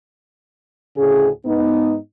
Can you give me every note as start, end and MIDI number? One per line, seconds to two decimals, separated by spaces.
0.97 1.28 38
0.97 1.28 45
0.97 1.28 49
0.97 1.28 68
1.45 1.95 44
1.45 1.95 59
1.45 1.95 63